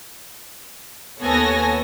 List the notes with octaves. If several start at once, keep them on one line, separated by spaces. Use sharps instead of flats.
D#2 B3 A4 C#5 G#5 A#6